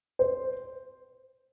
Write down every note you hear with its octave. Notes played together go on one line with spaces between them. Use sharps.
C5